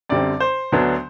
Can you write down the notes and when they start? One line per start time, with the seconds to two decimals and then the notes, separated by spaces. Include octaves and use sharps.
0.09 F#2 D3 G3 C4 D5
0.40 C5
0.72 D2 D3 F#3 B3 D4